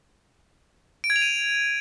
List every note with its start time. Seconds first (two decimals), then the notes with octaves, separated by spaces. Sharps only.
1.04 D7
1.10 G#6
1.16 F7
1.22 D#7